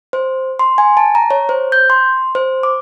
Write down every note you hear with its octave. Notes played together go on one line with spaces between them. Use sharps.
C5
C6
G#5
A5
A#5
C#5
C5
G6
C6
C5
D6